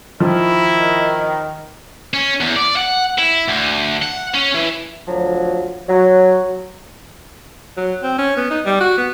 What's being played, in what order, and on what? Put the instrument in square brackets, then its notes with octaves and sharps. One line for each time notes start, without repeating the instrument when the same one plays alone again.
[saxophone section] D#3 [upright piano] F3 [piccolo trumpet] E4
[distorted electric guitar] C#4
E2
D5
F#5
E4
D2
F#5
C#4
E3
[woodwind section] D2 F3 F#3
F#3
[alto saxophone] F#3
C4
C#4
B3
D#4
G3
F#4
B3